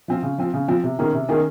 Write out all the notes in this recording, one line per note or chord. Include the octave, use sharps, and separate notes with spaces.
F3 C4 F4
C#3
F3 C4 F4
C#3
F3 C4 F4
C3
D#3 A#3 C#4 G#4
C3
D#3 A#3 C#4 G#4